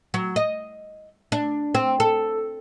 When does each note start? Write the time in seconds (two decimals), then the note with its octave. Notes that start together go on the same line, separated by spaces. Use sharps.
0.14 F#3
0.36 D#5
1.32 D4
1.75 C4
2.00 A4